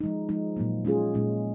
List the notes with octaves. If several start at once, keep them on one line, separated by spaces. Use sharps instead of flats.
F3 G#3 D#4
F3 G#3 D#4
A#2 F#3 A#3
G#3 C#4 F4 G#4
A#2 G#3 C#4